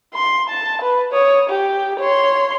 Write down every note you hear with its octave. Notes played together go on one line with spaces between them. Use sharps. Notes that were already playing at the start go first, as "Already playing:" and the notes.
C6
A5
B4
C#5 D#6
G4
C#5 C6